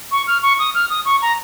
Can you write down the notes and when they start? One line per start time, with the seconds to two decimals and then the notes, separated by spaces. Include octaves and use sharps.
0.12 C#6
0.27 F6
0.43 C#6
0.59 D#6
0.75 F6
0.90 D#6
1.06 C#6
1.22 A#5